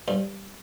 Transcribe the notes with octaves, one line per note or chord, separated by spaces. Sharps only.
G2